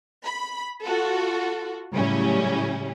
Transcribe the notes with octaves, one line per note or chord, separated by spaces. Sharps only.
B5
F4 F#4 A4
A2 C#3 F#3 G3 C#4 E4